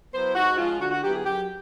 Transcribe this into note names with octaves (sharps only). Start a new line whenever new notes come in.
F#3 B3 E4 C5
G#2 F#4
F3 G#3 C#4 F4
D3 F#4
F#4
F#3 B3 E4 G4
G#4
F#2 G4